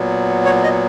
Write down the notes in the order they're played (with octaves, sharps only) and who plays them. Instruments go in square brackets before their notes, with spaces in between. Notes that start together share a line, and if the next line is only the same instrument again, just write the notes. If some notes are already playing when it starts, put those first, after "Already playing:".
Already playing: [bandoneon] A#2 F#3 B3
C#5
D#5